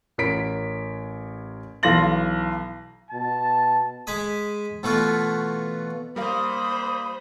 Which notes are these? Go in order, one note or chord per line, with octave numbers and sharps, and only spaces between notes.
A1 A#4 C#5 B6 D7
B1 E3 F5 C6 A#6 F#7
B2 A5
G#3 G#5 B5 D#6
B2 E3 A3 F4 F#4
G3 A#3 A#4 C5 F5 B5 D#6